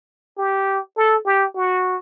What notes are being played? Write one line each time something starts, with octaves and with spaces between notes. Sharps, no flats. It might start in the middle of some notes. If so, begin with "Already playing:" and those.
G4
A4
G4
F#4